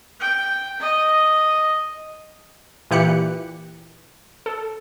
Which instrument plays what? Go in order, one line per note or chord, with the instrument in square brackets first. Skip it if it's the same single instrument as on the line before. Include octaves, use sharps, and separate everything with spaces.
[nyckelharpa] G5
D#5
[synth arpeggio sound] A#2 E3 G4 F#6 C#7
A4